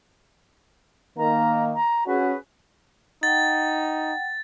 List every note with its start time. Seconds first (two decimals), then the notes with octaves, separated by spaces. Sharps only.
1.18 D#3 A#3 A#5
1.74 A#5
2.07 C#4 F#4 G#4 B4
3.23 D#4 F#5 G5 A6